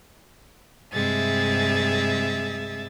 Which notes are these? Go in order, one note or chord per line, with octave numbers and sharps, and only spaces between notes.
G2 C3 G#3 G#4 E5 A6